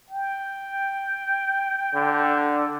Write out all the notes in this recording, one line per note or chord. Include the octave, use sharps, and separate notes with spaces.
G5
D3